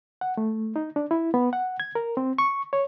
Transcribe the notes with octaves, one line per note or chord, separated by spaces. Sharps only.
F#5
A3
D#4
D4
E4
B3
F#5
G#6
A#4
C4
C#6
C#5